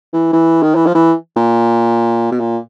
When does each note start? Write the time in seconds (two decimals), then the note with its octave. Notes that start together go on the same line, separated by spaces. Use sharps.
0.13 E3
0.33 E3
0.63 D#3
0.75 E3
0.86 F3
0.95 E3
1.36 A#2
2.32 B2
2.40 A#2